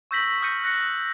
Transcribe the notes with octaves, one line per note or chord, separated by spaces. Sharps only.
C#6 E6 G6 A#6 B6 F#7
D#6 F6 G6 A#6 C#7 D#7
F#6 A#6 C#7